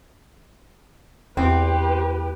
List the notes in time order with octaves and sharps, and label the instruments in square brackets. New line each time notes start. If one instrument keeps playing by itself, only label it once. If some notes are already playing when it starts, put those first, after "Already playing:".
[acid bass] E2 [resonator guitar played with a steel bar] C4 [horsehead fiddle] G4 B4